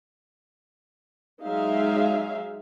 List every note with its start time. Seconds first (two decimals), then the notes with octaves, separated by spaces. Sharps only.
1.45 F#3 G#3 D#4 G#4 E5 F5